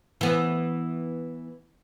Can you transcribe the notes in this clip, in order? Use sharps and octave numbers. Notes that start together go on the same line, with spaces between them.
E3 B3